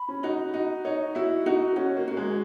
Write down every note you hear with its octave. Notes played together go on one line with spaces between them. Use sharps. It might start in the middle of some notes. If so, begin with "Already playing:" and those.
Already playing: B5
C#4
D#4 F#4
D#4 F#4
D#4 C#5
E4 F#4
D#4 F#4
C#4 F#4
A#3
A#3 F#4
G#3